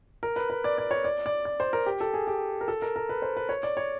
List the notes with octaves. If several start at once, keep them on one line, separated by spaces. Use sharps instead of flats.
A#4
B4
B4
D5
D5
C#5
D5
D5
D5
C5
A#4
G4
A4
G#4
G4
A#4
A4
A#4
A#4
B4
C5
B4
C#5
D5
C#5